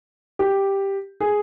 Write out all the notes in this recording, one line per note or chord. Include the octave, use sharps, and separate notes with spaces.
G4
G#4